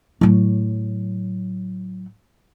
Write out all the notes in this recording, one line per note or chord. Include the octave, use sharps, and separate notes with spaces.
A2 F#3